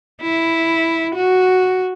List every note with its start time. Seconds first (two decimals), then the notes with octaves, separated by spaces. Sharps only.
0.22 E4
1.16 F#4